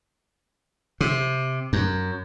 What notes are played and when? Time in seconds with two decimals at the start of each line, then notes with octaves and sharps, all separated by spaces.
1.01 C3
1.73 F#2